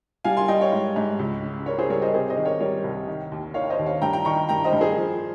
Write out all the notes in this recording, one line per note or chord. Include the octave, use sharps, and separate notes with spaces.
G3 F5 G#5
G#5 C6
G3 D#5 G5
C#5 F5
G#2
G#2
C#2
C#3
C#3 A#4 C#5
G#4 C5
G3 A#4 C#5
C5 D#5
C3 G#4 C5
C5 D#5
D#3
A#4 C#5
G3 A#4 C#5
C2
D#3
D#2
D#3 C#5 F5
C5 D#5
D#2
C#5 F5
G2 G5 A#5
G5 A#5
D#3 A#5 C#6
G2 G5 A#5
C5 D#5
G2
G#4 C5
F3